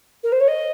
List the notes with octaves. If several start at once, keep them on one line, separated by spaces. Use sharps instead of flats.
A#4
C5
C#5
D#5